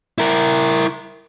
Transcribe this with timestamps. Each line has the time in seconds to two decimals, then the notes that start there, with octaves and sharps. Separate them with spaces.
0.18 E4 A#4